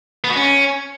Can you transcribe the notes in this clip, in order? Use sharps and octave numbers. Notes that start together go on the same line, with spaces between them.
B3
F#4
C#4